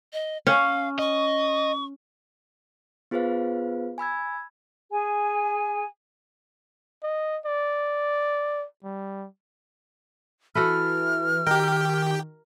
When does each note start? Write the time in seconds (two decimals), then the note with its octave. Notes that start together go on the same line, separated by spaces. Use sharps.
0.13 D#5
0.47 C#4 F5
0.99 D#5 C#6
3.11 B3 F4 G#4 B4 C5 F5
3.98 G#5 B5 E6 G#6
4.91 G#4 G#5
7.03 D#5
7.46 D5
8.84 G3
10.55 E3 F#4 A4 B4 F6
11.47 D#3 G4 A#4 G5